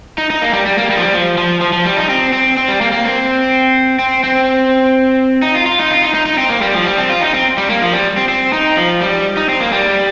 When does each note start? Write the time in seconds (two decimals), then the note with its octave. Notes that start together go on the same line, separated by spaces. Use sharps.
0.18 D#4
0.30 D#4
0.42 A#3
0.53 G3
0.66 G3
0.78 A#3
0.90 G3
0.97 F3
1.01 G3
1.14 F3
1.38 F3
1.61 F3
1.73 F3
1.86 G3
1.97 D#4
2.10 C4
2.33 C4
2.57 C4
2.68 G3
2.81 A#3
2.92 A#3
3.05 C4
3.99 C4
4.24 C4
5.42 D#4
5.55 F4
5.66 F4
5.79 D#4
5.91 F4
6.02 D#4
6.14 D#4
6.26 D#4
6.38 C4
6.50 A#3
6.62 G3
6.74 F3
6.86 G3
6.98 C4
7.10 F4
7.21 D#4
7.34 C4
7.58 G3
7.70 A#3
7.82 F3
7.93 G3
8.17 C4
8.28 C4
8.53 D#4
8.77 F3
9.01 G3
9.37 D#4
9.49 C4
9.61 A#3
9.73 G3